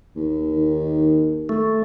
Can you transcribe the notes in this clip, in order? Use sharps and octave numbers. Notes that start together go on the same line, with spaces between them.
D#2
D#3
A3